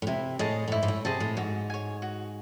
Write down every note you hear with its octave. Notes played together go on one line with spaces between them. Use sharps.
A2
C3 E4
A2 G#4 D#5 A5
A2
G#2 E4
G#2
A2
C3 G#4 D#5 A5
A2
G#2 F#4
C#5 G#5
F#4